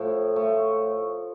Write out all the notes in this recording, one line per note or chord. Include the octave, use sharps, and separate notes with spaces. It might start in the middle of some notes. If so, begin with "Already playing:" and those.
Already playing: A2 F3
A3